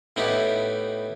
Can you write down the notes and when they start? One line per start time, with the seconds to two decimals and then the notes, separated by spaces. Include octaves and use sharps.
0.16 A2 B3 D#4 E4 G4